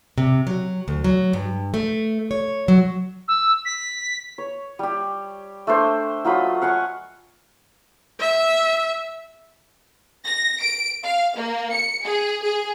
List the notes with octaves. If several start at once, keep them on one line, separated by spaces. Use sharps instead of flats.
C3
F#3
D2
F#3
G2
A3
C#5
F#3
E6
B6
C#5
G3 G4
A3 D4 C5
F#3 F4 D#5 B5
F5 F#5 G#5 C#6
E5
A#6
D7
F5
A#3
C#7
G#4
G#4